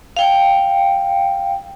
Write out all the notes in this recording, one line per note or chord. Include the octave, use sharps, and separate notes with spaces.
F5 G5